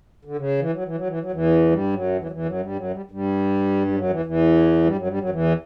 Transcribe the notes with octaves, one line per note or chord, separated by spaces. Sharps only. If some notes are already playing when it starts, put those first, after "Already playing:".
D3
C#3
E3
F#3
E3
F#3
E3
F#3
E2 E3
G2 G3
F#2 F#3
E2 E3
F#3
E2 E3
F#2 F#3
G2 G3
F#2 F#3
G3
G2 G3
G3
F#2 F#3
E2 E3
E2 E3
G2 G3
F#2 F#3
G2 G3
F#2 F#3
E2 E3